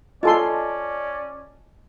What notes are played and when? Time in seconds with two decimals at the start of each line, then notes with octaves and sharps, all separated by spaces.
0.23 C#4 F4 A4 D5 D#5 G#5 A5 C6